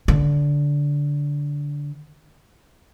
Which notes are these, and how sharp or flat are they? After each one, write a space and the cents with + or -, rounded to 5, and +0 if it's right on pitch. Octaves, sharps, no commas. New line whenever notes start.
D3 -15